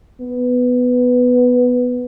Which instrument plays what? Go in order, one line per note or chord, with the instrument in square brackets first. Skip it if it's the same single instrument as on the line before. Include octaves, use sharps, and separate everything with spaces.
[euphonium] B3